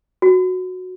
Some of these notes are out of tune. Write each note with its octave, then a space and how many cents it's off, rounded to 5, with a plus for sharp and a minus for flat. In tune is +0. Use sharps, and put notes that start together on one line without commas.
F#4 -10